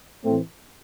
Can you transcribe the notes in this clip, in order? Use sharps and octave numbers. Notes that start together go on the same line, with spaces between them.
A2 E3 A3 C4